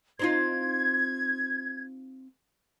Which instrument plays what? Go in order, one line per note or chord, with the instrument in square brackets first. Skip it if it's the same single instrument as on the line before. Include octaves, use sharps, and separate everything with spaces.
[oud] C4 D#4 F4 [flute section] G#6